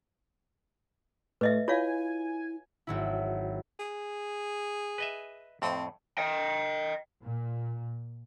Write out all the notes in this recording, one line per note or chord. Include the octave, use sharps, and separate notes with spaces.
A2 B4 D#5 E5
E4 F4 C#5 F5 G#5
G#1 F#3 E4
G#4
B4 D#5 E5
F2 A2 C4
D#5 G5
A#2